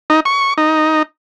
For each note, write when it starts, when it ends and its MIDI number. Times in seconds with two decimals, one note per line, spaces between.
0.10 0.20 63
0.25 0.54 85
0.58 1.03 63